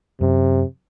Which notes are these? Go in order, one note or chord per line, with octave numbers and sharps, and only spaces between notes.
F#2 C3